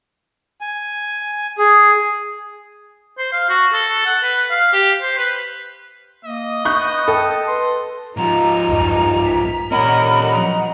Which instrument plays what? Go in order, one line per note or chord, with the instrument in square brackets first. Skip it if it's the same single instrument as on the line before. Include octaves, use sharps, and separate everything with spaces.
[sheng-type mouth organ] G#5
G#4
[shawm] C5
F5
F#4
A4
F#5
B4
F5
G4
C5
B4
[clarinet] A#3 [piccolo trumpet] D#5
[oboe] B3 [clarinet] B5 [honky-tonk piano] C#6 F#6 G6
[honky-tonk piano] A4 [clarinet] G5
[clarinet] B4 [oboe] C6
[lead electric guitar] G#2 F3 [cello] D#4 [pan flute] A#5
[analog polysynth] B1 E2 G2
B6
[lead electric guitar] A#2 C#4 [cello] A#4 [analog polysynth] D#5 F#5 D#6 [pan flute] B5
[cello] F3 F#3 [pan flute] A#5